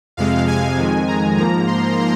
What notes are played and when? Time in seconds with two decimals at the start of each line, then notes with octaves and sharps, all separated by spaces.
0.17 F2 C3 G#3 F5
0.48 G#5
0.77 F2 D#3 G#3
1.08 A#5
1.37 G#2 F3 A#3 A#5
1.67 C6